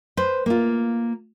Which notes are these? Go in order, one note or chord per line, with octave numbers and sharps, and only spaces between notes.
B4 C5
A#3 F4